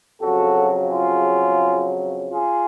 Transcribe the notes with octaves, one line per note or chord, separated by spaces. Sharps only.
F2 C#3 F#3 F#4 A4
F4 G#4
F4 G#4